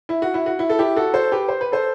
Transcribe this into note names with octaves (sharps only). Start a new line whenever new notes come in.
E4
F#4
E4
F#4
E4
A4
E4 G4
F#4 A4
A4 C5
G4 B4
C5
B4
A4 C5